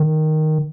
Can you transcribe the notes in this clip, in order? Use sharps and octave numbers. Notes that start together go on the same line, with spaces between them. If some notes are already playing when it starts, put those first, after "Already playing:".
Already playing: D#3